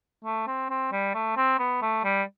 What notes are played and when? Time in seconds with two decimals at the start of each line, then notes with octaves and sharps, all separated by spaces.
0.25 A3
0.47 C4
0.70 C4
0.92 G3
1.14 A3
1.37 C4
1.59 B3
1.82 A3
2.04 G3